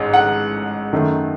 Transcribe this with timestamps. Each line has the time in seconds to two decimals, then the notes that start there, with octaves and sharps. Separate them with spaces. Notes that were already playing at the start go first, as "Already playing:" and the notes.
Already playing: A1 G#2
0.14 F#5
0.93 F#2 D#3 A3